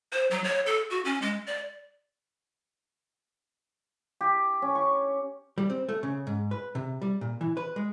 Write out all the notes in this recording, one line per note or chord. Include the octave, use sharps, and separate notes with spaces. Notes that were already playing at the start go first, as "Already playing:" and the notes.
C5
F#3
C#5
A4
F#4
C#4
G#3
D5
G4
C#4
C#6
G3
C4
A3
C#3
G#2
B4
C3
G3
A#2
E3
B4
G#3